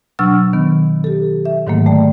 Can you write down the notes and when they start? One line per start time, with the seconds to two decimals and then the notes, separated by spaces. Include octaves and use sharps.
0.19 B2 F#3 D4 C#6 E6 F6
0.53 D#3 B3
1.04 G4 A4
1.45 E5
1.67 G#2 D3 D#3 F#3 A3 A#3
1.86 A3 D5 G5